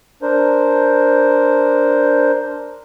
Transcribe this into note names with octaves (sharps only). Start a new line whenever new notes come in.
D4 A#4 C5